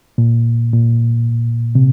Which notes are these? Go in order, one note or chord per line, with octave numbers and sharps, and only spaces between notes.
A#2
A#2
C3